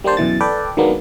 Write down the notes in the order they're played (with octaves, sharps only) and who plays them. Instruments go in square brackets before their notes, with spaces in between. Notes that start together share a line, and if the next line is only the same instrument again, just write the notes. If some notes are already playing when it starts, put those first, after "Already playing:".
[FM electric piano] G3 A#3 D4 C5 A5
F#2 B2 E3 A6
A4 B4 D5 G5
D#3 F#3 G#3 A#3 B3 D4